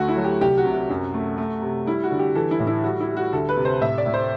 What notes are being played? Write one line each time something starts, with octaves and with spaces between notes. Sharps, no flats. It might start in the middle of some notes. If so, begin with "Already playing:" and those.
Already playing: D2 A3 F#4
E4
F#3 A4
G4
C2 G4
F#4
C3
F#4
F#2
A3
A3
C3
G3 E4
F#4
D3
G4
E3 A4
E4
A2
E4
G3 F#4
E4
G3
F#4
D2 A4
B4
C3
C5
A2 E5
D5
A2
C5